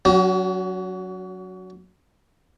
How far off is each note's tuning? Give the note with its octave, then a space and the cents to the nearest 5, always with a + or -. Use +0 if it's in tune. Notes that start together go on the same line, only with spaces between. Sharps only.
F#3 +0 C#4 +35 F#4 +45